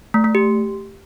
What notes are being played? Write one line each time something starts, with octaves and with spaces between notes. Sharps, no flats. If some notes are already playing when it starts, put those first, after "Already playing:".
A3
A3
G4